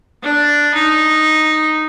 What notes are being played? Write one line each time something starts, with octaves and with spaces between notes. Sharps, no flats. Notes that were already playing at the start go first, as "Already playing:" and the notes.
D4
D#4